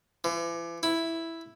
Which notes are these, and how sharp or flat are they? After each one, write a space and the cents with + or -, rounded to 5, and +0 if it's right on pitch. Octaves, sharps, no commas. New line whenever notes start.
E3 +40
E4 +0